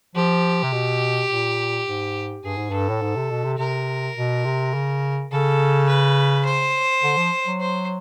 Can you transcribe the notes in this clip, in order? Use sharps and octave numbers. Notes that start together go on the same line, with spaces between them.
F3 G4
C3
B2
A#2
G#2
G2 G#4
G#2
G2 A4
A2
G#2
C3
B2
C3
C3 A#4
B2
C3
C#3
C#3 A4
B4
C5
D3
F3
F#3
C5